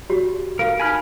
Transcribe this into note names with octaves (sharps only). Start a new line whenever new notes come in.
F#4 G4 C#5
A#4 F5
D#4 G#5 B5 F6